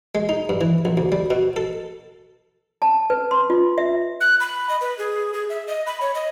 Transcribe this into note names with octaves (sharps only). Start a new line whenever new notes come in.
G#3
D#4
G2
E3
A#1
D2
G3
B2
A4
A5
B4
C6
F4
E5
F#6
B5
D#5
B4
G#4
G#4
E5
D#5
B5
C#5
D#5